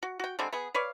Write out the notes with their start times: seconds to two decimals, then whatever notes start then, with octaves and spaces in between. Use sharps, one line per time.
0.03 F#4
0.20 F#4 G5
0.39 D3 G3 G#3 C4
0.52 B3 G#4
0.74 B4 C#5 D5 F5